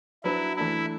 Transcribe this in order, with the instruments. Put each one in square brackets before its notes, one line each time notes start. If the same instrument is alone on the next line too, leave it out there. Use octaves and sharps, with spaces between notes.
[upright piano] F#3 D4 B4 [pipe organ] E4
[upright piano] E3 A3 D4 [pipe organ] E4